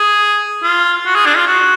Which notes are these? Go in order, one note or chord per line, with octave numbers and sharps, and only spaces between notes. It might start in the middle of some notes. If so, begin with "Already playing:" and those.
Already playing: G#4
F4
F#4
G#4
D4
F4
F#4